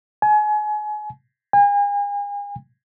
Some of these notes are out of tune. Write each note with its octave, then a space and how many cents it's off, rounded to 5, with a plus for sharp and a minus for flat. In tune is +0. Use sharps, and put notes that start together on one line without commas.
G#5 +30
G#5 -40